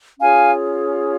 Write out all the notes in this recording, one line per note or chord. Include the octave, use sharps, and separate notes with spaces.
C#4 F4 G#4 C#5 F5 G#5